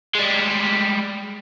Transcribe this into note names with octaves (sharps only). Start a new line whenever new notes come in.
G3 G#3